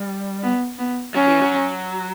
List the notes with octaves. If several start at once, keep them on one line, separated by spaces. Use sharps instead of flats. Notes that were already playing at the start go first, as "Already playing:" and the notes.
Already playing: G3
B3
B3
F#3 C#4
E3
F#3